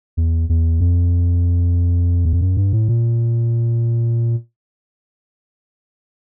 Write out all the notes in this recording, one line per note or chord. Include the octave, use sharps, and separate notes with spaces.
E2
E2
F2
E2
F2
F#2
G2
A2
A#2